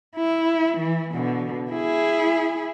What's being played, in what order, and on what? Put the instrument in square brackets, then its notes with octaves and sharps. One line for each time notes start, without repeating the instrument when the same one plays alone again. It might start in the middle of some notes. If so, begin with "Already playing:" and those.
[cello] E4
E3
B2 D3
E4 G#4